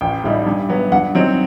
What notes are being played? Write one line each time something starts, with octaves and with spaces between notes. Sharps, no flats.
A1 G5
A2 G3 D#4
G2
F#3 B3
G2 F#5
F#3 C4 D#4